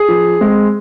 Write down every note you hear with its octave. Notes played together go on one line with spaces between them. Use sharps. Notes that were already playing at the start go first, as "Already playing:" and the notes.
Already playing: G#4
F3
G#3 C4